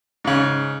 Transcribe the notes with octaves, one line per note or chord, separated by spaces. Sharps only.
G#2 C#3